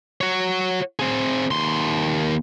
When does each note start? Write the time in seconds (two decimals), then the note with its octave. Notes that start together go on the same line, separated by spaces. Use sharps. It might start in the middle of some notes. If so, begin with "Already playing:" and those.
0.21 F#4 C#5
0.99 C4 G#4
1.51 D#2 C6